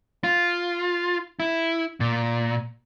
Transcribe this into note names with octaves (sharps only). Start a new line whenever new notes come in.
F4
E4
A#2